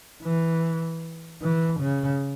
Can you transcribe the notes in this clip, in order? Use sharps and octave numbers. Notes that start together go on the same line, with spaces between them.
E3
E3
C#3